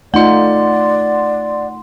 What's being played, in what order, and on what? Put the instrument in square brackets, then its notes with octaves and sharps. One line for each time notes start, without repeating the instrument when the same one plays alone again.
[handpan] A3 D#4 F4 [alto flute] D5 [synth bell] F#5 C6